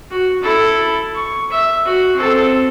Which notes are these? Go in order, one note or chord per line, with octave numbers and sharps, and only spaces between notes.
F#4
E4 A4
C#6
E5
F#4
C4 A4